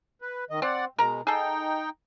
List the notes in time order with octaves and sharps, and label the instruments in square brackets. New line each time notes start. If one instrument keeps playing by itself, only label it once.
[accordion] B4
D#3 D#5
[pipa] C4 [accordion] D5 F#5
[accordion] B2 G#3 [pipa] A#4 A#5
[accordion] D#4 G5 [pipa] G#4 A4